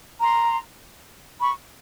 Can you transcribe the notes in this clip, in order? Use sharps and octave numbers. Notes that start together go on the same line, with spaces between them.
A#5 C6
B5 C#6